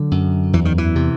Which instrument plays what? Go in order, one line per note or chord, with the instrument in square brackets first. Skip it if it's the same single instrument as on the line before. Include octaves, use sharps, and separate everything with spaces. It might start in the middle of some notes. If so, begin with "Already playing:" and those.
Already playing: [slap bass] D3 F#3
F#2
E2 E3
D#3
E3
C3